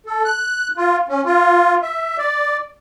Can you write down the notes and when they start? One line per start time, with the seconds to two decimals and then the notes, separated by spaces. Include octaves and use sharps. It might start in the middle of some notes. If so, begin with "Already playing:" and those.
0.06 A4
0.25 F#6
0.77 F4
1.09 C#4
1.25 F4
1.82 E5
2.18 D5